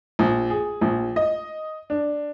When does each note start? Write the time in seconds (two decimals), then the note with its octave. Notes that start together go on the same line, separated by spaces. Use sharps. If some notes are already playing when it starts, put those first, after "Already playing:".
0.19 A#1
0.50 G#4
0.81 A#1
1.16 D#5
1.90 D4